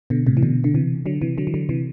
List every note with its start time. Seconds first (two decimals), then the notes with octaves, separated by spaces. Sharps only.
0.10 B2 D3
0.27 A2 C3
0.37 E3
0.43 B2 D3
0.64 D3
0.74 C3 E3
1.06 D3 F#3
1.22 C3 E3
1.38 D3 F#3
1.47 E3
1.54 D3 F#3
1.69 C3 E3